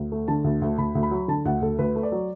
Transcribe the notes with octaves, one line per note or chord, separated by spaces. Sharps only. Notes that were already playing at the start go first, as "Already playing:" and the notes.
Already playing: D2
A3
D3 A5
D2
D2
D2 B5
D2
B5
F#3
D3 A5
D2 F#5
D2 A4
D2 B4
A3
D5
F#3